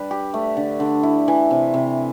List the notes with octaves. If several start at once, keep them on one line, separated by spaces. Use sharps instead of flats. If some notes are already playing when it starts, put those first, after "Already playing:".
Already playing: G3 D4 B4
G4
A3
D3
D3
E4
E3
C3
C3